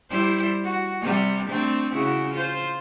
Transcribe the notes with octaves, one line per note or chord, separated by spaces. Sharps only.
G3 E4 C5
F#4
C3 G3
A3 C4 D4
C#3 E4 F#4
F4 C5